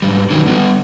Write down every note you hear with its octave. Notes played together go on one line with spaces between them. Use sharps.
G#2 G3
D#3 F#3 C#4 D#4
G3 B3